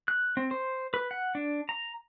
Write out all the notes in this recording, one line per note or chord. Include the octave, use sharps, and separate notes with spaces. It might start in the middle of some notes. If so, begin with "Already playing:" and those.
F#6
C4
C5
B4
F#5
D4
A#5